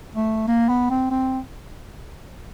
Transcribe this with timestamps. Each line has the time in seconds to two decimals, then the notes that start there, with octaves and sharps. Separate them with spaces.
0.15 A3
0.47 A#3
0.69 B3
0.90 C4
1.11 C4